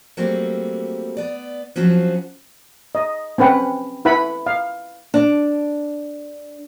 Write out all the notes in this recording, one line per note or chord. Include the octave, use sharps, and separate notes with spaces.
F#3 G3 A3 A#3 C4 F#4
B3 D5
F3 F#3 C4 C#4 F4 F#4
D#5
C4 C#4 B4 F#5 G5
E4 B4 F#5 B5
F5
D4